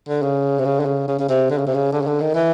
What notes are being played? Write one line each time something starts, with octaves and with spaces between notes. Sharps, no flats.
D3
C#3
C3
C#3
D3
C#3
C#3
C#3
C3
D3
C#3
C3
C#3
D3
C#3
D3
D#3
E3